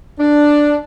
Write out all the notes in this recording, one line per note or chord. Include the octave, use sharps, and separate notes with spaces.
D4